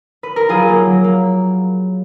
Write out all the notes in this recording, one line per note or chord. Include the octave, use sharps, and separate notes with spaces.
B4
A#4
F#3 F4 G#4
A#3
F#3
A#3